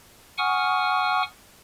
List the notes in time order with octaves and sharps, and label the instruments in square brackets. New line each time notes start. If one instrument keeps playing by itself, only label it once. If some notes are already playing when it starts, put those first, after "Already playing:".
[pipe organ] F#5 G#5 C#6 D#6 F6